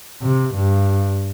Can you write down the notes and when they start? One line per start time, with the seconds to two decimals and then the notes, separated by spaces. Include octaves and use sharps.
0.22 C3
0.55 G2